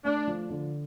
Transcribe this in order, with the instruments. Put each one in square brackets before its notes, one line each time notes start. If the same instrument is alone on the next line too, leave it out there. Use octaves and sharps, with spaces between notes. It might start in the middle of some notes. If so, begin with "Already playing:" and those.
[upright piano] A3 [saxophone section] D4
[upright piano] F3
D3